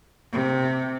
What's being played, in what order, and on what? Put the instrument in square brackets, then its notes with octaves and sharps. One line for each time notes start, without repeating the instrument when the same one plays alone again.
[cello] C3